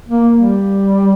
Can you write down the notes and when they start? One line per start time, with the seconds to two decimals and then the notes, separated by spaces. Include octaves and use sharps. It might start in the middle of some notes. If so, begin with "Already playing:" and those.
0.09 A#3
0.37 G3